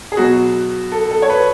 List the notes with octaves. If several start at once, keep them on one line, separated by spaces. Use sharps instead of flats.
G#4
B2 F#3 F#4
A4
A4
C#5
B4